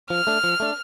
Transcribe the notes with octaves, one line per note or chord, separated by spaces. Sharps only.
F3 F6
A3 D4
F3
A3 D4